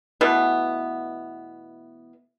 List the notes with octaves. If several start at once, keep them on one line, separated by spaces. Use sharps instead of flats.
B2 E3 A3 B3